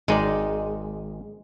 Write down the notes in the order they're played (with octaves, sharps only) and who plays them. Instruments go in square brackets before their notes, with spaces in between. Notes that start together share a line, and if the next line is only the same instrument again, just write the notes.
[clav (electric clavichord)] G#1 D#4 D5 [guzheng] G#3